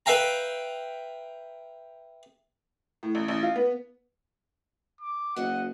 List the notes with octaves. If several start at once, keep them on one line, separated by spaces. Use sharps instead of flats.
B4 E5 F5 G5 A#5
A2
A1
A1
F4
B3
D6
F#1 F#4 D#5 F#5